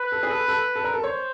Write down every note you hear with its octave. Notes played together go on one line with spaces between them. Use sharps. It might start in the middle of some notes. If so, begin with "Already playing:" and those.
Already playing: B4
A4
G#4
A4
A4
A4
A#4
A4
C5 C#5